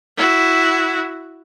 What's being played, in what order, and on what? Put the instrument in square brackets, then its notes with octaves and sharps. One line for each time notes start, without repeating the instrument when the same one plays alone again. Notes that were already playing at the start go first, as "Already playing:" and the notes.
[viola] E4 F#4